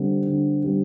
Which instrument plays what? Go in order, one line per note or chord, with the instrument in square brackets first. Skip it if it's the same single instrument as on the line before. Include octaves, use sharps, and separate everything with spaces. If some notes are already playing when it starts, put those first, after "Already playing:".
Already playing: [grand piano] D3 G3 C4
D3
G3 C4